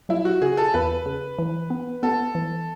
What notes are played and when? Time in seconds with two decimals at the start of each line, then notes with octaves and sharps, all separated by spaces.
0.09 F#3 E4
0.25 F#4
0.42 C#3 G#4
0.57 A4
0.74 E2 B4
1.06 C#3
1.39 E3
1.70 B3
2.03 B3 A4
2.35 E3